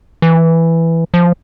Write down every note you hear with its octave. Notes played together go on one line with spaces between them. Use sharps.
E3
F3